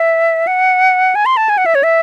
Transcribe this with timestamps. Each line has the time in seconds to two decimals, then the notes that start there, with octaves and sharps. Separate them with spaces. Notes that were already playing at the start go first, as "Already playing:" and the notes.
Already playing: E5
0.47 F#5
1.15 G#5
1.26 C6
1.37 A5
1.49 G#5
1.58 F#5
1.66 E5
1.75 C#5
1.83 E5